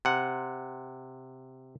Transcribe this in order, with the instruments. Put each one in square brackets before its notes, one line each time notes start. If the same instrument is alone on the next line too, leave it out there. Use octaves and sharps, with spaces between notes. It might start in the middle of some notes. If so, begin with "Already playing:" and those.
[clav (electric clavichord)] C3 F#5